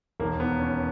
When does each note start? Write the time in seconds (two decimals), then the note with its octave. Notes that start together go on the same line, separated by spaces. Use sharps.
0.20 E1 D#2 D#3 A#3
0.40 B3
0.60 C#4